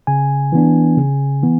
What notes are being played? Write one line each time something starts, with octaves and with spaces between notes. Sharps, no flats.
C#3 G#5
E3 B3 D4
C#3
E3 B3